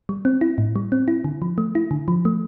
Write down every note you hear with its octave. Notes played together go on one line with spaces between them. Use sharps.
G3
C4
E4
A2
G3
C4
E4
D3
F3
A3
E4
D3
F3
A3